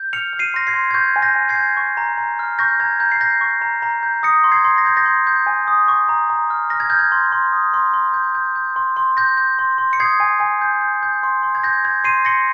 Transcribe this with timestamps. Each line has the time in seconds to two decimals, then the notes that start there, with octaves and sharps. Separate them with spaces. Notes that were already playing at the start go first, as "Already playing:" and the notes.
Already playing: G6
0.13 F6 C#7 F7
0.33 F6
0.39 C7 D#7
0.54 C6 A#6
0.67 G#6 C7
0.74 C6
0.91 G#6
0.94 C#6 G6
1.16 G#5
1.22 G6 A#6
1.36 G#5
1.49 G#6 C7
1.56 G6
1.77 C#6
1.97 A#5
2.18 A#5
2.39 F6
2.59 C#6 G6 A#6
2.80 A#5 G#6
3.00 A#5 G6
3.12 C7
3.21 G6 A#6
3.41 C#6
3.62 A#5
3.82 A#5
4.03 G6
4.23 D#6 A#6 C#7
4.44 C6
4.52 G#6 C7
4.65 C6
4.78 A#6
4.85 G6 G#6
4.97 G6 A#6
5.05 C6
5.27 G6
5.46 G#5
5.68 D#6
5.88 C#6
6.09 A#5
6.30 A#5
6.50 F6
6.70 F6 A#6
6.80 G#6
6.90 F6 G6
6.99 G#6
7.12 C6
7.32 C6
7.53 D#6
7.74 C6
7.94 C6
8.14 G6
8.35 G6
8.56 G6
8.76 C6
8.97 C6
9.17 G6 A#6
9.37 G6
9.59 C6
9.78 C6
9.93 C#7
10.00 D#6 G#6 C7
10.20 G#5
10.40 G#5
10.61 G6
10.81 G6
11.03 G6
11.23 C6
11.43 C6
11.55 G#6
11.64 G6 A#6
11.84 G6 G#6
12.04 C6 C7 D#7
12.25 C6 A#6 C#7